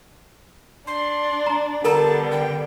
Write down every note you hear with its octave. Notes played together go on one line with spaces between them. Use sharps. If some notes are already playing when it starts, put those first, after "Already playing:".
D4 C6
A#5
D3 G3 B3 A4 A#4 A5 A#5
G5